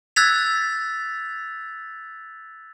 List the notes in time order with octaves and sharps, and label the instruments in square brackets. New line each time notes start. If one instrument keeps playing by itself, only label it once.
[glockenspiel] E6 F#6 G#6 A6 B6 F7